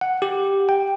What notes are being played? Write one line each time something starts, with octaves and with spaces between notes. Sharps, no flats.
F#5
G4
G5